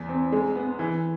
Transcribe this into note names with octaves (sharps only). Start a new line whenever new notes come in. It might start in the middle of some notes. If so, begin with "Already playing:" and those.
Already playing: E2
C4
G#3
B3
E3